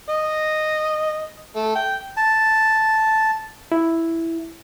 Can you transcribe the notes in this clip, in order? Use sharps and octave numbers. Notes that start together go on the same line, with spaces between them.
D#5
A3
G5
A5
E4